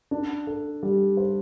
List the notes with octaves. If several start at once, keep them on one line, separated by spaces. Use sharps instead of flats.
D4
A4
G3
C5